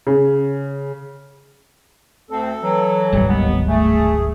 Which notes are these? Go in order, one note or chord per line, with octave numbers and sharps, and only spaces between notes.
C#3
D2 C4 A4
E3 F#3
D1 G#1 G3
D#2 B3
A3 G#4